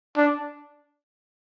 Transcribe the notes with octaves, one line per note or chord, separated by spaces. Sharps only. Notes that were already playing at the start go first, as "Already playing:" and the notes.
D4